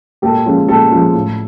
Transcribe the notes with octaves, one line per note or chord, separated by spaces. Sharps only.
A#2 G4 A4
F3 G#3 C#4 F4
A#2 G4 A4
F3 G#3 C#4 F4
A2